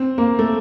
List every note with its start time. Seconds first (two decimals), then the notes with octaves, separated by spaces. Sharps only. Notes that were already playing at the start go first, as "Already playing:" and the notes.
Already playing: C4
0.18 A#3
0.39 A3